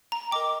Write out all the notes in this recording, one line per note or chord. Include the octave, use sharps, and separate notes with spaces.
A#5
A#4 D#5 G5 D6